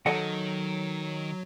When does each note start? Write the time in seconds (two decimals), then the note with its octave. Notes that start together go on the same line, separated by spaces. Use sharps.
0.06 D#3 F#3 A4 D#5 F#5